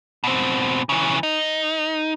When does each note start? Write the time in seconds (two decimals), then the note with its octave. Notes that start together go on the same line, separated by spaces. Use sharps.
0.24 B2 C4
0.89 C#3 E3
1.23 D#4